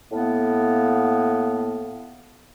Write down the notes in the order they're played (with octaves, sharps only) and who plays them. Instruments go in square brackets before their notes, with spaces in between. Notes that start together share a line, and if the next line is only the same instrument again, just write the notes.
[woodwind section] A2 A#3 B3